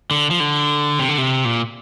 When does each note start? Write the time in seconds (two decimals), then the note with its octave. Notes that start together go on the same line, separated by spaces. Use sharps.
0.11 D3
0.31 F3
0.40 D3
0.99 C3
1.09 D3
1.18 C3
1.45 A#2